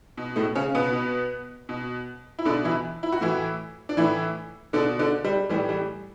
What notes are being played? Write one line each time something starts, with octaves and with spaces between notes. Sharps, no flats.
B2
A2 A3
C#3 C#4
B2 B3
B2
B2
E4
B2 D3 D4
E3 E4
E4
F#4
A2 E3 E4
D4
A2 E3 E4
B2 D3 D4
D3 D4
G3
A2 E3 G3
G3